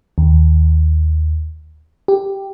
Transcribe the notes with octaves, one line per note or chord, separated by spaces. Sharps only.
D#2
G4